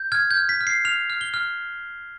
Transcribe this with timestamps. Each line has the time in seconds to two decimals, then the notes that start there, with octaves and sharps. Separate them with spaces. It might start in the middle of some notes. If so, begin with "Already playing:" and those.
Already playing: G6
0.12 F6 G#6
0.31 G6
0.37 F6
0.49 B6
0.61 F6
0.67 C7
0.85 F6 F7
1.10 F6
1.21 G7
1.34 F6